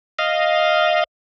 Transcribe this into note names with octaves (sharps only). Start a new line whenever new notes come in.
D#5 F5